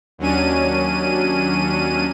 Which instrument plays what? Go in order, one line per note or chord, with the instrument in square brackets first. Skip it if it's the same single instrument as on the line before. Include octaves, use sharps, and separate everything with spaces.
[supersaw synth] D#2 F#3 C#4 D4 D#7